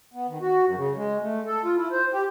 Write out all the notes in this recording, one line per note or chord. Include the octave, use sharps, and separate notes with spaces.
B3
D#3
F#4
F#2
C#3
G#3
A3
A4
F4
E4
C5
G4